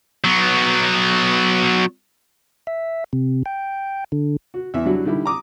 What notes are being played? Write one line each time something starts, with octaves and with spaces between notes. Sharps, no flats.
F#3 B3
E5
C3
G5
D3
F#4
E2 E5
F#3 G3 D4 E4 F#4
D3 D#3 G3 E4 G4
A#5 D6 D#6